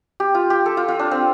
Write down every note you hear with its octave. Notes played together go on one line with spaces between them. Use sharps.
G4
F4
G4
A4
F4
F4
D4
C4